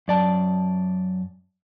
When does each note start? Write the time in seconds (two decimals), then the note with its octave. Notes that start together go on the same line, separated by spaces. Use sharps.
0.08 F#2 D5 A5